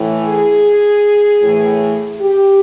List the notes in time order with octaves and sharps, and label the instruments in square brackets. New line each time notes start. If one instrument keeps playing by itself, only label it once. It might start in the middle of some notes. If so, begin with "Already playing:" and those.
Already playing: [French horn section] A2 E3
G#4
A2 E3
G4